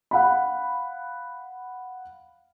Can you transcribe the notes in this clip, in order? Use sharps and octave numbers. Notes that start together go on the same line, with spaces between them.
F5 F#5 B5